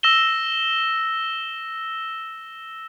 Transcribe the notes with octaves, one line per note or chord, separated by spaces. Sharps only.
E6 A#6 E7 G7